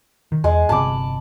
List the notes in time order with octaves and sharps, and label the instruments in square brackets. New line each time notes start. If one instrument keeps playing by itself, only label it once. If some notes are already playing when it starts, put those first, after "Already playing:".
[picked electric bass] D#3
[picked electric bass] E2 [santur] G#3
[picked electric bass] G1 C3 [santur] A5 B5 D6